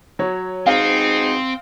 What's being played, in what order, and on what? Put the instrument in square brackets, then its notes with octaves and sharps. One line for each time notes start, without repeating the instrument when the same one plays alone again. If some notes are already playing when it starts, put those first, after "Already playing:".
[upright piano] F#3 C#5
[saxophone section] G#2 B2 D#4 [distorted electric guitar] C4 [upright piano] F5 C7